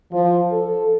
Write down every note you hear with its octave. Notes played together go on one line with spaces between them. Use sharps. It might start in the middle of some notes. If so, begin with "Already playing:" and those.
F3
A4